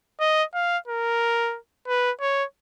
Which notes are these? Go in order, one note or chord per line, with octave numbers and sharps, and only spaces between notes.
D#5
F5
A#4
B4
C#5